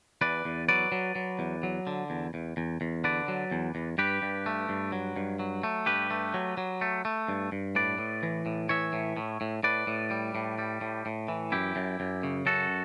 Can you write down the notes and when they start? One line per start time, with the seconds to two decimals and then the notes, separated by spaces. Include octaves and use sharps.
0.21 E2 B4 D5
0.45 E2
0.69 F#3 B4 D5
0.92 F#3
1.15 F#3
1.39 E2
1.63 F#3
1.87 D3
2.10 E2
2.34 E2
2.57 E2
2.81 E2
3.04 D3 B4 D5
3.28 F#3
3.51 E2
3.75 E2
3.98 G2 G4 B4
4.22 G2
4.46 A3
4.69 G2
4.92 F#3
5.16 G2
5.39 F#3
5.63 A3
5.86 G2 G4 B4
6.10 A3
6.34 F#3
6.57 F#3
6.81 A3
7.05 A3
7.29 G2
7.52 G2
7.75 A2 B4 D5
7.98 A2
8.23 E3
8.46 A2
8.69 E3 C#5 E5
8.93 A2
9.17 A2
9.41 A2
9.63 A2 B4 D5
9.87 A2
10.11 G3
10.35 A2
10.58 G3
10.81 A2
11.06 A2
11.28 E3
11.52 F#2 E4 G4
11.76 F#2
12.00 F#2
12.23 C#3
12.46 F#2 F#4 A4